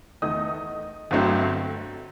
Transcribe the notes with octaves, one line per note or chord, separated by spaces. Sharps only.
E2 D#3 A3 D#4 D#5 D#6
G1 G2 F#3 A3 C4